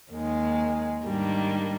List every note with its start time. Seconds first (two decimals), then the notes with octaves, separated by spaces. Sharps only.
0.12 D#2 D#3 G#3
1.04 G#2 D#3 G3 A#3 D4